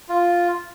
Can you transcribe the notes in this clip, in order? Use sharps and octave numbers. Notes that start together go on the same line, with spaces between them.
F4